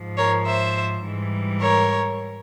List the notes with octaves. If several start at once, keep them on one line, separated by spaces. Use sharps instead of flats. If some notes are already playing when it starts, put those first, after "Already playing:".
Already playing: G#2 F3
A#4 C#5
C5 E5
G#2 E3 G3
A#4 C#5